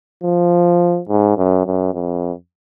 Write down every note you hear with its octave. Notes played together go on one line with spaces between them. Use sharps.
F3
G#2
F#2
F#2
F2